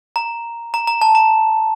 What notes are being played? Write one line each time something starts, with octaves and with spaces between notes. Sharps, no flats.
A#5
A#5
A#5
A5
A#5